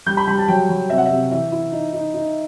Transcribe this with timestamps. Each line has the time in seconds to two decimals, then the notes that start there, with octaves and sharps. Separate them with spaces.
0.06 G3 G6
0.17 B5
0.27 G3 B5
0.38 A5
0.48 F#3 G5
0.69 F#3
0.89 C3 E5
0.98 F#5
1.06 C3 E5
1.31 E3 E5
1.52 E4
1.72 D#4
1.93 D#4
2.14 D#4